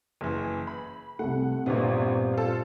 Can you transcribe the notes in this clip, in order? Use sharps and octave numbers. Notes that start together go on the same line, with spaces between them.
F#1 E3
B5
C2 A3 F#5
G1 E2 G2 A#2 B3 C4
F4 A4